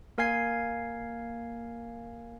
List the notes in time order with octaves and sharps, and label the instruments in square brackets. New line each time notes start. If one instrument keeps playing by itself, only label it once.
[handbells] A#3 A#4 F5 G#5 G#6 C7